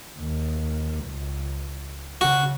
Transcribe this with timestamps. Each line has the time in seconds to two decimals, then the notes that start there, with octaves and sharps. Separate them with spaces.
0.18 D#2
1.05 C#2
2.21 C#3 F#4